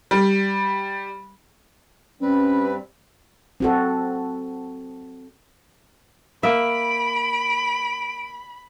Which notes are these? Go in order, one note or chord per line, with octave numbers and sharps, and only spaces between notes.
G3
G2 G3 C4 C#4 B4
C4 F#4 A4
A#3 E5 B5 D7